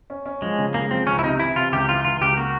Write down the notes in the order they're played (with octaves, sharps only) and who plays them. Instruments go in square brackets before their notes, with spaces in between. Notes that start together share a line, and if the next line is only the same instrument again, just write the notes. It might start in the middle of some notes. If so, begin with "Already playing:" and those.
[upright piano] C#4
C#4
[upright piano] F3 [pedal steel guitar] G#3
[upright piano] C#3
[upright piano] G#3 [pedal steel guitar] A#3
[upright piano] F3 [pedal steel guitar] C4
[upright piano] C#2 [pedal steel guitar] C#4
[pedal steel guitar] E4
[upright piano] C3 [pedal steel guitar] D#4
[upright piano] E3 [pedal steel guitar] E4
[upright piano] C3 [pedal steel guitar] F4
[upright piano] C#2 [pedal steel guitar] G4
[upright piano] E3 [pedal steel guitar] F4
[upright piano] C#2 [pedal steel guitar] F4
[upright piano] C#2 [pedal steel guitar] G4
[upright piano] A#3 [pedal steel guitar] F#4